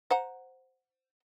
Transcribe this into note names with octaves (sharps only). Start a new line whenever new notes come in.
C5 F#5 A#5